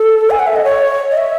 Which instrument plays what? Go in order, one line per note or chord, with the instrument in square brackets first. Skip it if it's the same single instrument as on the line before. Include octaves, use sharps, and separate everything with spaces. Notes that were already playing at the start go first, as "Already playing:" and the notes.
Already playing: [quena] A4
G#5
F#5
E5
D#5
C#5
D#5
E5